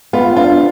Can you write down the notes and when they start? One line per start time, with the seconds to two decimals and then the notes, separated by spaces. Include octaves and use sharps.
0.13 B3 F4
0.36 D4 F4